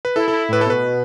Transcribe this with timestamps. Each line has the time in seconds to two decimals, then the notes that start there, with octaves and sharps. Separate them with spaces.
0.05 B4
0.16 E4 A4
0.28 E4 A4
0.48 A2 B4
0.61 A4
0.65 B2 B4